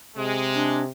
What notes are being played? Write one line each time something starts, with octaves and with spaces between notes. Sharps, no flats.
C3 G#3
D4